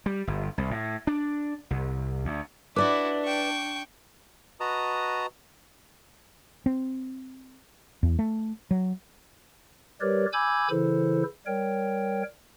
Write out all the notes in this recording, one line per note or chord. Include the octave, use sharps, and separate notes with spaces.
G3
G1
C2
A2
D4
C2
D2
D4 E4 F#4 B4 D5 E5 D6
G5 C#6
F#4 B4 D#5 A5 A#5 D#6
C4
E2
A3
F#3
G3 G4 A#4 B4 C#5 D5
G#5 B5 D6 E6 G6 G#6
C#3 E3 E4 A4 C5
G3 A#4 C#5 G5